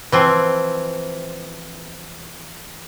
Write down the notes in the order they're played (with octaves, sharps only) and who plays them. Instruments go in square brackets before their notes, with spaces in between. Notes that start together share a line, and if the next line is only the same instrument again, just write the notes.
[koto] E3 F3 C4